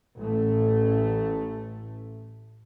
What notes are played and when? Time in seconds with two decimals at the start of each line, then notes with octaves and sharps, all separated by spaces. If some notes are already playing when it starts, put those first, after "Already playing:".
0.17 A1 A3